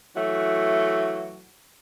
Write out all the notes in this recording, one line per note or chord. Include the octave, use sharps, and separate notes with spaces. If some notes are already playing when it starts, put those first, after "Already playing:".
E3 F#3 A3 F#4